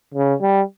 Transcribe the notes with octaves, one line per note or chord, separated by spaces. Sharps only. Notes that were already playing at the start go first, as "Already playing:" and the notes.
C#3
G3